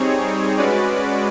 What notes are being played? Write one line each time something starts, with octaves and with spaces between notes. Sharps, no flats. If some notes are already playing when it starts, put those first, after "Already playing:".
Already playing: G3 C4 D#4 G#4 C#5
G#3 C#4 F#4 B4 D5